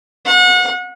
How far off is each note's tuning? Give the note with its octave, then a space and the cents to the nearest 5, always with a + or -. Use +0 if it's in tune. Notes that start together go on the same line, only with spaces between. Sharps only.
F#5 -30